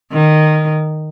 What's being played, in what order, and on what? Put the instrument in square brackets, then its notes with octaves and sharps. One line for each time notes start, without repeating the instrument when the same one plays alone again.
[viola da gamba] D#3